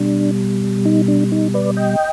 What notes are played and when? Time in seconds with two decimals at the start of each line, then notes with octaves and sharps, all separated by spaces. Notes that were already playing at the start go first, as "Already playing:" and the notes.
Already playing: B2 G3 D4
0.85 D#4
1.08 D4
1.32 D#4
1.54 B4 D5
1.77 D#5 G5